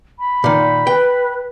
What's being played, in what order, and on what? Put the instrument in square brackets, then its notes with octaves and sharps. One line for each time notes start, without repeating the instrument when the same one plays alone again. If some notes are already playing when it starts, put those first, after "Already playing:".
[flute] B5
[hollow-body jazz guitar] A#2 D#3
[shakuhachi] B4 [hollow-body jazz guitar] G5